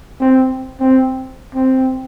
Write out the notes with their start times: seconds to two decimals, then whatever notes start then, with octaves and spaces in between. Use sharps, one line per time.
0.20 C4
0.80 C4
1.55 C4